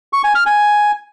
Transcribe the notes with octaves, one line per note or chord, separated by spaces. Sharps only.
C#6
G#5
F6
G#5